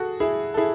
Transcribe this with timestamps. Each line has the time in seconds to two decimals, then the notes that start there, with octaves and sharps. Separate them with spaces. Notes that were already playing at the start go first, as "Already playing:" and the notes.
Already playing: F#4 G#4 A4
0.20 E4 G#4
0.54 A4
0.57 E4 G#4